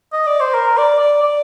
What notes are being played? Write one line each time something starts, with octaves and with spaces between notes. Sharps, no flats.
D#5
D5
C5
A#4
D5
D5
D5